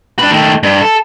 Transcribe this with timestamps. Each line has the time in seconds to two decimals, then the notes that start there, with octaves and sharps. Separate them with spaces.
0.19 D4 B4
0.31 D#3 A3
0.63 G2
0.81 A4